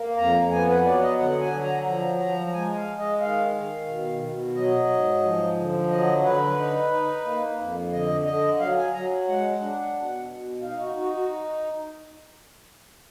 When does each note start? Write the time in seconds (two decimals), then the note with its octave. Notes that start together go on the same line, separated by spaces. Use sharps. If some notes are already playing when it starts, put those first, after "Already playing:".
Already playing: A#3
0.17 F2 A#5
0.51 B3 G#5
0.68 B4
0.85 F#3 D5
1.02 D#5
1.19 D3 F#5
1.41 G#5
1.52 F#3
1.63 A#5
1.86 F3 A#5
2.20 F3 A#5
2.47 A#5
2.53 G#3 G#5
2.76 F5
2.87 G#3
2.98 D#5
3.21 D#3 F5
3.55 D#3
3.88 B2
4.22 B2
4.56 F#3 D#5
4.89 G#2
5.23 F3
5.57 D3
5.90 F#3 D#5
6.24 D3 B4
6.58 D#4
6.92 D#4
7.25 A#3
7.59 F2
7.92 D3 D#5
8.26 D3 D#5
8.60 F#3 F5
8.77 G#5
8.93 F#3 A#5
9.27 G#3 F#5
9.61 D4
9.95 B2
10.28 B2
10.62 D#4 F5
10.79 F#4
10.95 D#4 F#4
11.13 F#4